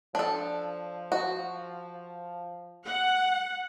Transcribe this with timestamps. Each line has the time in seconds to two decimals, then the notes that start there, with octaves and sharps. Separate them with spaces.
0.15 F3 D4 A4
1.12 F#4
2.87 F#5